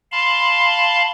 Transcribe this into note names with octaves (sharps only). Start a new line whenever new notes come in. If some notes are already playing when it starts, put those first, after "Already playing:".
F5 A5 B5 C6